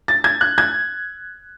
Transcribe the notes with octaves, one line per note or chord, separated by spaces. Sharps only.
A6
G#6
F#6
G#6